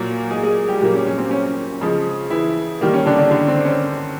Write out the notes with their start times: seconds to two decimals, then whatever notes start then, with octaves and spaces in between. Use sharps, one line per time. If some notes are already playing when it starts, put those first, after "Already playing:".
Already playing: A#2 F#3 A#3
0.31 G#3 G#4
0.43 G#3 G#4
0.68 G3 G4
0.81 A#2 F#3 G3 A#3 G4
0.94 C#4
1.06 C#4
1.18 C4
1.31 C#4
1.81 C#3 F3 G#3
2.30 E3 E4
2.81 D#3 G3 A#3
2.93 C#4
3.06 D3 D4
3.19 D3 D4
3.30 D3 D4
3.48 C4
3.65 C#4